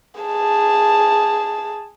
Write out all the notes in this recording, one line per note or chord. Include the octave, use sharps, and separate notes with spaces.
G#4 A5